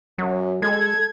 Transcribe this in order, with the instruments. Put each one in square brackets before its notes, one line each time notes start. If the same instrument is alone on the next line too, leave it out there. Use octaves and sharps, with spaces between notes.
[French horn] F#2 [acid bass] F#3
[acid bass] G#3 [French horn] A4 [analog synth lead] G#6